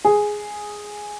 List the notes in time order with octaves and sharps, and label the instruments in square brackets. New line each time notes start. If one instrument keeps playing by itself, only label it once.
[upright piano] G#4